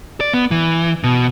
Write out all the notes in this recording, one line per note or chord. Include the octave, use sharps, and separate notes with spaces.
D5
B3
E3
B2